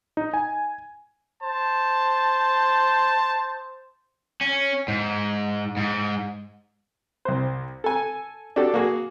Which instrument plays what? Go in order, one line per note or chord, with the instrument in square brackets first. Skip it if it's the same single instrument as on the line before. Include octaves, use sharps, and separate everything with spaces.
[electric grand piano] D#4
G#5
[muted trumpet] C5 [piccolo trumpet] A5
[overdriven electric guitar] C#4
G#2
G#2
[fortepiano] C2 C5
A4 G#5
D4 F#4 G4 A4
A#3 F#4 G#4